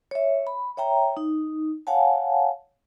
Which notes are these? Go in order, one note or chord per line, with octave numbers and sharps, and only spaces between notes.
C#5 E5
B5
C#5 E5 G5 A#5
D#4
C#5 F5 F#5 G#5 A5